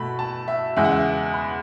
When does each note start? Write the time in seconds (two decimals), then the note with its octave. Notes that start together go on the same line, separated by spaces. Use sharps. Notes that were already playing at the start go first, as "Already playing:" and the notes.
Already playing: B2 A3 B5
0.19 A5
0.48 E5
0.76 E2 C#3 G#3 E5
0.84 F#5
0.92 E5
1.34 B5